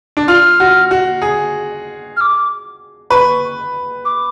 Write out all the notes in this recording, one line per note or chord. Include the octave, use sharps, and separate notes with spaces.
D4
F4 F6
F#4
F#4
G#4
F6
D6
B4 C#6
D6